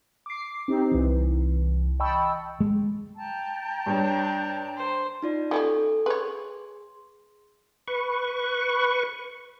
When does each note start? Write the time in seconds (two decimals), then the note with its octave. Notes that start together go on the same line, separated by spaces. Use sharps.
0.26 D6 C7
0.68 C4 D#4 G4
0.92 C2 E3
2.00 D#5 G5 A5 B5 C#6 E6
2.60 G#3
3.16 G5 A5 A#5
3.86 G2 D4 C#5
4.77 C5
5.22 D#4 F4 D5
5.51 F#3 G3 C#4 A4
6.06 G#4 B4 C#5 C6
7.88 B4 C#6